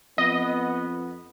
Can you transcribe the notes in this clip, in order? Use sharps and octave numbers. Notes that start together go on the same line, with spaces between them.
F2 B3 D#5